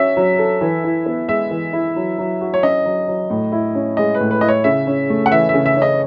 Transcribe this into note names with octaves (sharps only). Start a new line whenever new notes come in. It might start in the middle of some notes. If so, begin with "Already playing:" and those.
Already playing: F#3 C#4 F#4 E5
F#3
A4
E3
E4
B3
G#3 E5
E3
E4
F#3
F#3
F#4
C#5
C#4 D#5
F#3
F#3
A2
E4
C#4
G#3 D#5
B4
A2
B4
E4 D#5
C#5
C#3 E5
C#4
A3
F#5
E3 E5
E5
C#3
E5
C#4 D#5